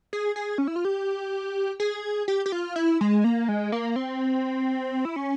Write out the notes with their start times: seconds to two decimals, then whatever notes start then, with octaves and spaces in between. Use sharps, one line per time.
0.13 G#4
0.36 G#4
0.58 C#4
0.68 E4
0.76 F4
0.85 G4
1.80 G#4
2.28 G4
2.46 G4
2.52 F4
2.76 E4
3.01 G#3
3.24 A#3
3.49 G#3
3.72 A#3
3.96 C4
5.05 E4
5.16 C#4